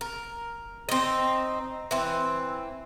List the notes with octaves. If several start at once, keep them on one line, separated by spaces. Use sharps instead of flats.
A#4
C4 D#4
E3 C4